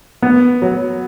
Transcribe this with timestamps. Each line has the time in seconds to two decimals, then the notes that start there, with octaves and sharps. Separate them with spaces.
0.22 B3
0.62 F#3